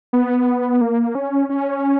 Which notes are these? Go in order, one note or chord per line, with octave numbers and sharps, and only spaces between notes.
B3
A#3
C#4
C#4